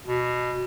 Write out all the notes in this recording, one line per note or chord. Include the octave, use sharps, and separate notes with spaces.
B2